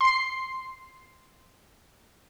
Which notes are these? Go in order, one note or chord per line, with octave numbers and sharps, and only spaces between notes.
C6 C7